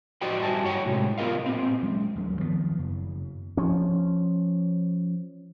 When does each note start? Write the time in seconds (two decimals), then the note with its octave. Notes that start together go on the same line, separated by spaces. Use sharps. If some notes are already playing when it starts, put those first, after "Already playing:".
0.21 F#4 C5 D5 D#5 G5
0.42 G2 D#5 E5 G#5 A5
0.64 F#4 C#5 F#5 G5
0.85 A2 C3 E3 G#3
1.18 B3 F4 A#4 D#5 F5
1.46 A#2 C4
1.83 F#3 G#3 C#4
2.16 D2 G2 F#3
2.38 D#3 F3 G3 B3
2.79 F#2 C#3
3.57 F3 C#4